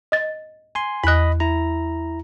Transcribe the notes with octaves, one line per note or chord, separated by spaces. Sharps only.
D#5 A6
G#5 C6
E2 D#5 B5 F#6
E4 A#5